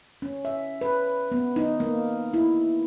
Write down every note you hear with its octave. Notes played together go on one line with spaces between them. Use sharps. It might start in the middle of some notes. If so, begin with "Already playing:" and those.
C#4
E5
B4
B3
D#4
A#3
E4